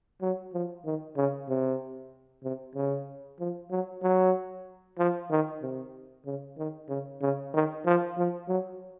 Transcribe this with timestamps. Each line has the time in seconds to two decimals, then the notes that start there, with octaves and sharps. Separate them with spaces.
0.21 F#3
0.54 F3
0.85 D#3
1.16 C#3
1.48 C3
2.44 C3
2.75 C#3
3.39 F3
3.71 F#3
4.03 F#3
4.99 F3
5.30 D#3
5.62 C3
6.26 C#3
6.58 D#3
6.89 C#3
7.22 C#3
7.54 D#3
7.86 F3
8.17 F3
8.48 F#3